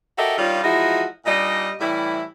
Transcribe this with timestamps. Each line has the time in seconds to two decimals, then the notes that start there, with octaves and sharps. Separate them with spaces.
0.17 F#4 G4 A4 A#4 D#5 E5
0.38 D#3 G3 C#4 D4 F4
0.63 E3 F3 G#3 D#4 E4 F#4
1.26 A#2 G3 D4 D#4 D#5
1.80 A2 E3 G3 E4